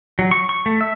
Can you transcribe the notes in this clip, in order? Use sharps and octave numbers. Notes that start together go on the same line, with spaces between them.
F#3
C#6
C#6
A3
E5